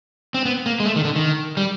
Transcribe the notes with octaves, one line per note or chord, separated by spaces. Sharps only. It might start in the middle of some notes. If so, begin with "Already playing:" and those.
C4
B3
A#3
G#3
A3
D#3
D3
D#3
G3